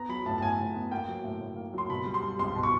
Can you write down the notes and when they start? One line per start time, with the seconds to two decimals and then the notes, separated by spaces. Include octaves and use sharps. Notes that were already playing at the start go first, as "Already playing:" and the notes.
Already playing: B3 A#5
0.09 F#3 B5
0.26 A2 A5
0.38 A5
0.42 A2 G#5
0.59 A2
0.75 B3
0.91 A#3 G5
1.08 F#3
1.24 A2
1.41 A2
1.56 A#3
1.74 F#3 C6
1.89 B2 B5
2.06 G3
2.14 C6
2.23 G3
2.39 C#2 C6
2.56 B2 C6
2.63 C#6